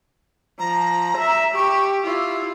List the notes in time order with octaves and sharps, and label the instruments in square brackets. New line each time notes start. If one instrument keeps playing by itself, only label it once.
[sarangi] F3 [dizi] A#5
[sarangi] E5
[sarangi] G4 [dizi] C#6
[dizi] E4 [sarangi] F4